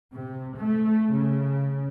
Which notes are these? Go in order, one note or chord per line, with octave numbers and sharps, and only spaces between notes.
C3
A3
C#3